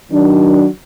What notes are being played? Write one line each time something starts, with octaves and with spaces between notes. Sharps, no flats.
D#3 F#3 D4